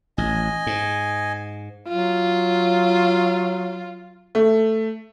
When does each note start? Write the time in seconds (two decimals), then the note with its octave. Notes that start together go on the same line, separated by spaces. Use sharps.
0.18 A1 D#5 G#5
0.67 G#2
1.88 F#3 F4
4.35 A3